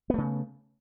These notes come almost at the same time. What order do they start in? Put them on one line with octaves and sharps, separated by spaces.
B3 A3 C#3